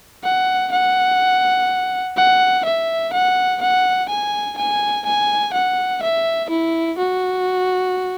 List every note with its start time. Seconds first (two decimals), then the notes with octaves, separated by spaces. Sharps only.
0.24 F#5
0.72 F#5
2.17 F#5
2.65 E5
3.13 F#5
3.62 F#5
4.09 G#5
4.58 G#5
5.06 G#5
5.53 F#5
6.02 E5
6.50 E4
6.98 F#4